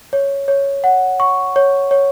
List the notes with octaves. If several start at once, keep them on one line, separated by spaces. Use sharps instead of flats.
C#5
C#5
F#5
C#6
C#5
C#5